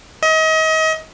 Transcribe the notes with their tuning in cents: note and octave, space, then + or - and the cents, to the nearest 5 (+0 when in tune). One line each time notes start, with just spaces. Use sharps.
D#5 +35